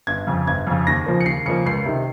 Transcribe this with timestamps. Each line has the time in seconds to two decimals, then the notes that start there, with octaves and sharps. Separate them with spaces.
0.07 G1 G#6
0.27 F2 C#3
0.47 G1 G#6
0.67 F2 C#3
0.87 D#2 A#6
1.06 C#3 F3 A#3
1.21 C#7
1.26 D#2 C7
1.46 C#3 F3 A#3 C#7
1.65 C#2 C7
1.85 C3 D#3